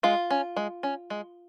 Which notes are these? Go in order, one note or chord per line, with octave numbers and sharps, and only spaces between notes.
G#3 F4
C#4
G#3
C#4
G#3